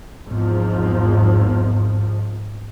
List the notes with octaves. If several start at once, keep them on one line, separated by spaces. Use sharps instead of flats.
G#1 E2 G#2 F3